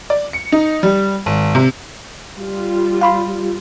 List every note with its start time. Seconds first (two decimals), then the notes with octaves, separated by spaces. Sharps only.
0.10 D5
0.33 C#7
0.52 D#4
0.83 G3
1.26 G#1
1.55 C3
2.39 G3 F4
3.01 F5 B5 C6